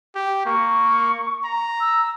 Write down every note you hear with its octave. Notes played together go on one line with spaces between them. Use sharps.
G4
A#3 C#6
A#5
E6